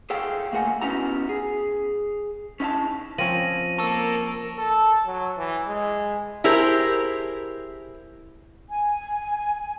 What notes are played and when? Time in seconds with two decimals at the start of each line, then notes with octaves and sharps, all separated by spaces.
0.10 G#4 A4 C#5 F5 G5
0.52 C#2 A3 A#3 A4 F#5 G#5
0.81 B3 C#4 D#4 E4 F#4 A#5
1.29 G#4
2.60 C#4 D#4 E4 C#5 G#5 A5
3.18 F3 C4 C#4 A#6 D#7 F#7
3.79 A#3 A4 A#4 C#6 E6
4.58 A4
5.06 F#3
5.38 E3
5.68 G#3
6.44 E4 G4 G#4 A#4 C5
8.68 G#5